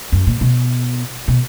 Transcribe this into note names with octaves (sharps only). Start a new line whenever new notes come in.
F#2
A#2
B2
B2